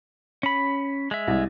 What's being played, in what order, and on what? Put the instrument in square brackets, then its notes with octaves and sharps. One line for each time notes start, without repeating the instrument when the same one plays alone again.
[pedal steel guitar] C#4 B5
G#3 E5
[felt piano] C2